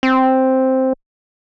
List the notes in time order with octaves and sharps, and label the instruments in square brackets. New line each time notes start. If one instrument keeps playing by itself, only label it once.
[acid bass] C4